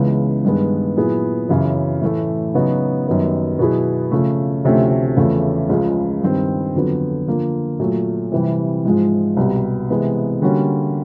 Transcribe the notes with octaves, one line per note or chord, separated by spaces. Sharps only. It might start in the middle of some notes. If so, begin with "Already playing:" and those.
Already playing: C#2 C#3 E3 G#3 B3
G2 D#3 G#3 B3
A#2 F#3 B3 E4 G#4
F#2 C#3 E3
A2 E3 A3
C#3 F#3 B3 D#4 F#4
F#2 D#3 G3 B3 D#4
B2 F#3 B3 E4 G#4
C#3 F3 A3
D2 C3 F3 A3 C#4
E2 C#3 F3 A3
C#2 C#3 F3 G#3
G2 D#3 G3 C4
F2 D3 F#3 B3
D3 F3 A#3
A#2 F#3 A3
C3 E3 G3
G#2 F3 G#3
C2 B2 G3
C3 E3 G#3 B3
D3 G3 A#3 C#4 F#4